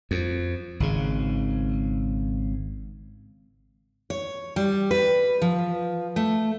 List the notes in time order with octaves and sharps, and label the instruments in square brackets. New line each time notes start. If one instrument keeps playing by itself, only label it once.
[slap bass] F2
G#1 C#3
[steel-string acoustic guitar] C#5
G3
B4
F3
A3